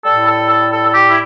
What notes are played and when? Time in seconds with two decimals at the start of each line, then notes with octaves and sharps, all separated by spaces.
0.05 A2 G3 A4
0.28 A4
0.50 A4
0.72 A4
0.86 A4
0.94 G4
1.07 E4